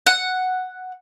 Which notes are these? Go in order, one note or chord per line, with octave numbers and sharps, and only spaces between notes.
F#5